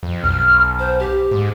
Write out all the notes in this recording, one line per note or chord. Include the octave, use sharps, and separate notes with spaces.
F2
B1 F6
C5
G4
G#2